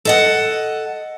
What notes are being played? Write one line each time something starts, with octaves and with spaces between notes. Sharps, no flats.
A4 D#5 F#5